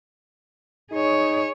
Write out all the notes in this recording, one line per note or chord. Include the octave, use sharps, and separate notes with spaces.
D#4 G#4 C#5